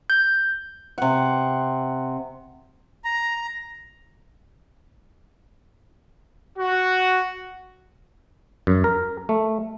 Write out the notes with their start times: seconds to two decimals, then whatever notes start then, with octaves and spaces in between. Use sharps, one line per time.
0.10 G6
0.98 C3 F#5
3.04 A#5
6.58 F#4
8.67 F#2
8.84 A#4
9.29 A3